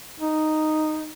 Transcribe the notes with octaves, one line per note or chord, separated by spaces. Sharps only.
D#4